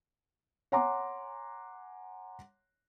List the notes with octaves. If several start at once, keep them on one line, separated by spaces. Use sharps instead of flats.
C#5 F#5 G#5 A#5 C6 D6